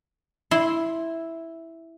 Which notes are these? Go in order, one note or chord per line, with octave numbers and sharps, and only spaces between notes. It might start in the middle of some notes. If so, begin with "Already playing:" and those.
E4 C6